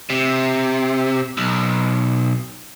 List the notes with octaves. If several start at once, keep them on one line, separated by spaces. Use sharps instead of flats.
C3
B1